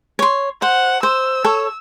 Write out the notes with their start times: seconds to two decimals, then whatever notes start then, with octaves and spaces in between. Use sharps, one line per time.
0.19 C#5 C6
0.62 C5 F#5
1.03 C5 E6
1.44 A4 C#5